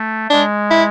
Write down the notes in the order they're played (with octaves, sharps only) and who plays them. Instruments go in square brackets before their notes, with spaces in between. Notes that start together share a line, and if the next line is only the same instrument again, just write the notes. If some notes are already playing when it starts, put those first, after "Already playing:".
Already playing: [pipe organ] A3
[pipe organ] G#3 [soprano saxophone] D4
[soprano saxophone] E4